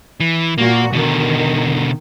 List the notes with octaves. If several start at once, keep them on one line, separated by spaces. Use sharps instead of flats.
E3
A#2 A#3 F#4
B2 D3 D#3